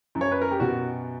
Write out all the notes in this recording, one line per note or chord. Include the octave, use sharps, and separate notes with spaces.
F#2
C#5
B4
A#4
G4
B2 F#4